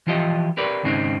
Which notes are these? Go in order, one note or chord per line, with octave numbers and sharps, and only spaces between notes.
E3 F3 F4 G4 D#5
G4 A#4 B4 D5
D#2 G#2 C#3 C4 D4 D#4